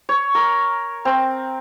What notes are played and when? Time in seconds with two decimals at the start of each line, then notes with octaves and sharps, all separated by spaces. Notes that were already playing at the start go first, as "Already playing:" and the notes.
0.09 C#5
0.35 A#4
1.05 C4